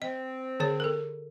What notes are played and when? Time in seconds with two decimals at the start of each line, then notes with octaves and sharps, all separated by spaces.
0.02 C4 D#5
0.60 D3 G#4 C#5
0.80 A4 A#4